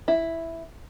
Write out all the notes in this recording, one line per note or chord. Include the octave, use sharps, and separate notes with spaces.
E4